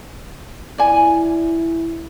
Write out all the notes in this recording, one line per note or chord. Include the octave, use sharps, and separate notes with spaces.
E4 D5 G#5